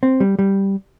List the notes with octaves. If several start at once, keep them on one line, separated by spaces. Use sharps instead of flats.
C4
G3
G3